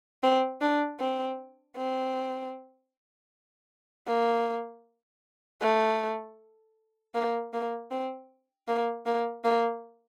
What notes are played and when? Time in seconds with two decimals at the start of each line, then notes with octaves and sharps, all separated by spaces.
0.23 C4
0.61 D4
1.00 C4
1.77 C4
4.07 A#3
5.61 A3
7.15 A#3
7.53 A#3
7.91 C4
8.68 A#3
9.06 A#3
9.44 A#3